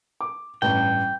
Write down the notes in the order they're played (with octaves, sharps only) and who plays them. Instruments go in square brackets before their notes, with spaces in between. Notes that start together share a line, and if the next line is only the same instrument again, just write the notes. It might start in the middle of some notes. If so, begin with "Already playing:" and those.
[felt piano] D6
[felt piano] A1 G2 [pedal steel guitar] G5